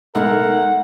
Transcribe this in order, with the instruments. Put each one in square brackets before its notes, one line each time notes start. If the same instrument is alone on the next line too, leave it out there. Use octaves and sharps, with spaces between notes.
[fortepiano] B1 A3 [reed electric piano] G#3 D#4 E5 [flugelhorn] A#4 [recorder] F#5